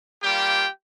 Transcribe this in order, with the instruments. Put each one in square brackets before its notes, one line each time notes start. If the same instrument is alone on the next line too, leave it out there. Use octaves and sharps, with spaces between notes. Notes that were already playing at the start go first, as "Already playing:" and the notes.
[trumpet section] G3 A#3 F4 G4 G5